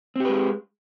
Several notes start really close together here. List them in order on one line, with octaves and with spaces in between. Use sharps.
C4 G4 B4 G#3